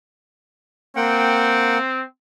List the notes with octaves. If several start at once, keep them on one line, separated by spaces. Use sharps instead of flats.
A#3 C4 F#5 G5